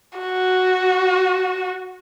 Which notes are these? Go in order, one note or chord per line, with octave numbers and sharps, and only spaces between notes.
F#4